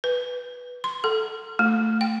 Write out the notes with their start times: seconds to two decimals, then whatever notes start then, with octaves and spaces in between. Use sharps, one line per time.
0.04 B4
0.84 C6
1.04 A4
1.59 A3
2.01 G5